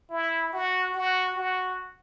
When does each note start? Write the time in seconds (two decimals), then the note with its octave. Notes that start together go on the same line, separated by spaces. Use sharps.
0.10 E4
0.53 F#4
0.94 F#4
1.36 F#4